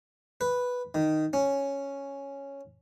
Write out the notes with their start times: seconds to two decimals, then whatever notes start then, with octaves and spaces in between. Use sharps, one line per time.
0.41 B4
0.95 D#3
1.33 C#4